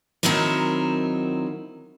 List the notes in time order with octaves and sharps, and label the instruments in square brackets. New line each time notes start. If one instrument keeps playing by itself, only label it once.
[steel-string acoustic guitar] D#3 F#3 C4 D#4 E4 A#4